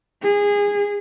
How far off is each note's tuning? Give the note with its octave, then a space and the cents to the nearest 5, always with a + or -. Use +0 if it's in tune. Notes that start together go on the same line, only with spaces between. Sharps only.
G#4 -20